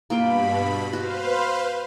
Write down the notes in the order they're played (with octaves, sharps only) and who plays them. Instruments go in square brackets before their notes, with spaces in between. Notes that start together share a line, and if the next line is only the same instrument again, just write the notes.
[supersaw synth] G2 B2 B5 [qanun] A#3 F4 G5
[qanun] F#4 [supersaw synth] B4 C5 F5